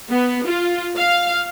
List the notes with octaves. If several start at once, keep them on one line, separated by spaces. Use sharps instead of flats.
B3
F4
F5